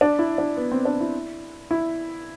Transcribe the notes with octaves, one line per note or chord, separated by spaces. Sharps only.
D4
E4
D4
B3
C4
D4
E4
E4